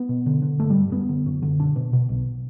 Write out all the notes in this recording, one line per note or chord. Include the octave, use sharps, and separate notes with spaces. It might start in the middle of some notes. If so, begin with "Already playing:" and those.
Already playing: B3
B2
D3
D3
G1 A3
G3
G1
F#2 B3
D3
F#2
D3
B2 D4
B2
B2
B1